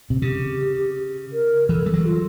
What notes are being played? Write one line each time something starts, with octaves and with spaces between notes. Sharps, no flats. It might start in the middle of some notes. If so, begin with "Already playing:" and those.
C3
C#3 G4
A#4
E3 A4
G3
F#3
F4